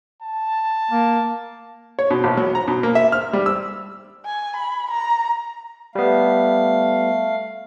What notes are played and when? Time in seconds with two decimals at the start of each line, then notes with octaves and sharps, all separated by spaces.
0.22 A5
0.91 A#3
1.99 C#5
2.10 B2
2.24 A#1
2.37 F#3
2.55 A#5
2.68 B2
2.83 A#3
2.95 E5
3.12 F6
3.33 G3
3.46 E6
4.25 G#5
4.57 B5
4.91 A#5
5.95 G3 A3 B3 F5